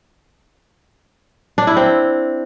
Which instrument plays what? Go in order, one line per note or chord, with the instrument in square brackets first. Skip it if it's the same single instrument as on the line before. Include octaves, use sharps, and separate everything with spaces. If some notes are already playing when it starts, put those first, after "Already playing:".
[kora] D4
E4
C4